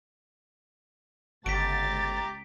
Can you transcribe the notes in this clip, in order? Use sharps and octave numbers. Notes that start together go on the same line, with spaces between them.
G1 C#2 G4 A#5 A6 B6 D7